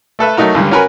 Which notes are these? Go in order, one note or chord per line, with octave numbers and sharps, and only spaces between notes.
A3 A4 B4 E5
F#3 A3 D#4 F#4 A#4
C#2 G2 D3 G3
C#4 F#4 A#4 B4 G#5 B5